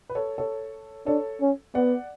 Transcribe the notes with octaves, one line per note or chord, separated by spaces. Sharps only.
B4
A4 C#5
A4 C#5
D4 A4 C#5
C#4
B3 D5 F#5